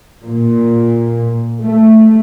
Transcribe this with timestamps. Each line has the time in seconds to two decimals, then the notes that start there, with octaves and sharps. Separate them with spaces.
0.25 A#2
1.61 A3